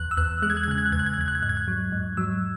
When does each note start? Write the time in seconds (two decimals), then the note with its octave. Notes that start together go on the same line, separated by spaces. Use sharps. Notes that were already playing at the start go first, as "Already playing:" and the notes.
Already playing: E2 F#6
0.11 E6
0.17 E2 F#6
0.42 G#3 F#6
0.50 G#6
0.57 F#6
0.63 G#6
0.68 C#3 F#6
0.78 G#6
0.86 F#6
0.92 E2 G#6
0.99 F#6
1.06 G#6
1.14 F#6
1.18 E2 G#6
1.28 F#6
1.35 G#6
1.42 G#2 F#6
1.49 G#6
1.57 F#6
1.68 F#3
1.92 G#2
2.17 F#3 E6